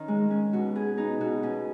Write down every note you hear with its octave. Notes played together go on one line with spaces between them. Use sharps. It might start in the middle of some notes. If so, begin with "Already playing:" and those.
Already playing: D#3 C#4
G#3
C#4
B2 F#4
B3 G#4
B3 D#4
B2 F#4
B2 C#4